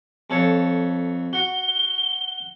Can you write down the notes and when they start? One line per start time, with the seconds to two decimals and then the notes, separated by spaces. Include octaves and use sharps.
0.30 F2 A4 C#5
1.33 F#4 G7